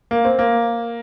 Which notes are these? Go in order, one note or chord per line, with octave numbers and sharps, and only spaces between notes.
A#3
C4
A#3